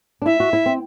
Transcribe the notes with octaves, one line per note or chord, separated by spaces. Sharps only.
D4
E4 E5
F#4
E4
C4